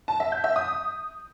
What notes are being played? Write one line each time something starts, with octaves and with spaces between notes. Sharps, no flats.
A5
E5
G6
E5
D#6